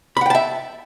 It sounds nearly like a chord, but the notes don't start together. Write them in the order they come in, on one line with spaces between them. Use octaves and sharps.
B5 F#5 G5 A5 E5